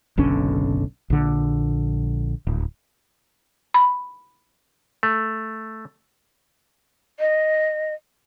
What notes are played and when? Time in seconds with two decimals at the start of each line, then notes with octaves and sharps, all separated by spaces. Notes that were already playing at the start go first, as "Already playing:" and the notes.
0.17 F#1 B1 D3 C#4
1.10 A#1 D3
2.47 D1
3.74 B5
5.03 A3
7.20 D#5